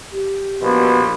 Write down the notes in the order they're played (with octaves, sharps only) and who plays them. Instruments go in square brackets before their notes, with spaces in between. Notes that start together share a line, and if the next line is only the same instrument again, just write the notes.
[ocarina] G4
[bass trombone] A#1 [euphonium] B2